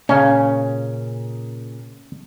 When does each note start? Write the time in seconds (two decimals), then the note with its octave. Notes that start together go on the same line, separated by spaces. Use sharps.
0.09 A#2 C#3 C#4